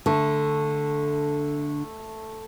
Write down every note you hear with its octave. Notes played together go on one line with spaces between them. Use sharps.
D3 A3